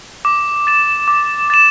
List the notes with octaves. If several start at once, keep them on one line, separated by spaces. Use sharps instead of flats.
D6
A6 E7
D6
A6 E7